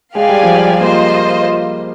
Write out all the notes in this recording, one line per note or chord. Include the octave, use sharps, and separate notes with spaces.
G#3 G4 D5 F5 G#5
G3
F3
G3
A#3 F4 C5 D#5